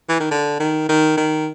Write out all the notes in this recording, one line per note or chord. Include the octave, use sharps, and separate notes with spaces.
E3
D#3
D3
D#3
D#3
D#3